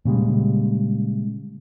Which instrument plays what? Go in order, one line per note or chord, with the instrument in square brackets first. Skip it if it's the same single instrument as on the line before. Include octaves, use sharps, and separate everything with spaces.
[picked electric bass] A#2 C#3 G3 G#3